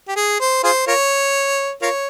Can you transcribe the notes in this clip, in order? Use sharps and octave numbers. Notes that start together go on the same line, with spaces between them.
G4
G#4
C5
F4 G#4 C5
F4 A#4 C#5
F4 A#4 C#5